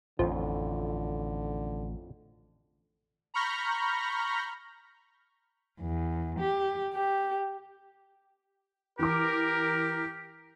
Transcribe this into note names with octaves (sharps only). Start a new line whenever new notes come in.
A1 F2 A2 D3 F3
A#5 B5 C#6 F6 G6 A#6
E2
G4
G4
E3 G4 A#4 D6